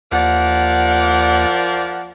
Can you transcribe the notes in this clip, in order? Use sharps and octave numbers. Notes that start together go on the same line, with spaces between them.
D#2 F3 A#4 D5 F#5